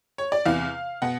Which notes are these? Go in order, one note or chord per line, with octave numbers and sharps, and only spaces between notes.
C#5
D5
E2 C3 E3 F5
B2 F#5